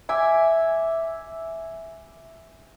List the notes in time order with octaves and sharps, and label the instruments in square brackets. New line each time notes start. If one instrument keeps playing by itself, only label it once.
[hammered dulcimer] E5 G#5 D6